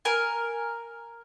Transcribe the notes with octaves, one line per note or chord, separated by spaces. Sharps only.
A#4 G#5